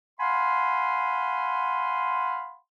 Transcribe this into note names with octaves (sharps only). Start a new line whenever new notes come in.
F5 F#5 G#5 B5 C6